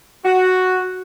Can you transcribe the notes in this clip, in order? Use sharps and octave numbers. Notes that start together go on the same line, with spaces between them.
F#4